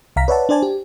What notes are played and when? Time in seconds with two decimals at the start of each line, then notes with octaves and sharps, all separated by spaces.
0.16 C2 F5 A#5 B6
0.28 B4 C#5 D5 E5 F#5 A5
0.49 D4 C5 D5 G#5 A5
0.63 G4